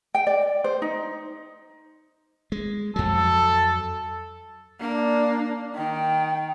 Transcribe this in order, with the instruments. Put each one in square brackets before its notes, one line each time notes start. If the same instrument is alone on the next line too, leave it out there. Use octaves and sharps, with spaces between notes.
[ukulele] G5
D5
C5
D#4
[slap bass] G#3
[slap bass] F2 F#3 [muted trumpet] A4
[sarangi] A#3 [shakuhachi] D4
[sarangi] D#3 [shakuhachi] G5